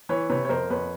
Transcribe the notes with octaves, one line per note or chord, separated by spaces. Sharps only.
E3 B4 C#5
C3 B4 C#5
C#5
F2 A#4 C5
F2 B4 C#5